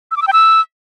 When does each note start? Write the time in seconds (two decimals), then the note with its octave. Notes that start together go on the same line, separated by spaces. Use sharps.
0.11 E6
0.17 D6
0.22 E6
0.27 G5
0.33 E6